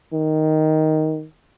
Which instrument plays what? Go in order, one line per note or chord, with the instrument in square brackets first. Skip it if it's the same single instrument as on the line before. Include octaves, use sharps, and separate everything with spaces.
[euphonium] D#3